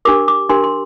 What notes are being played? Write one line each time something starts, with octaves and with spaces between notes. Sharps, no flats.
D4 G4 A#4 D6
D6
D4 G4 A#4 C6
C6